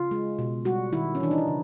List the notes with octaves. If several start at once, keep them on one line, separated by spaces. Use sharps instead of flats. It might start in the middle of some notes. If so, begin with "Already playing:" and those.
Already playing: C#3 F4
G#3
B2
G3 F#4
D#3 E4
C#4
E3 D4
D#4
E4
C#3